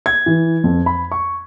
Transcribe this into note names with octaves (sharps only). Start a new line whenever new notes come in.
G#6
E3
F2
B5
C#6